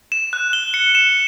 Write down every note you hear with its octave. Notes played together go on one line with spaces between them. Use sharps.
E7
F#6
G7
C#7
E7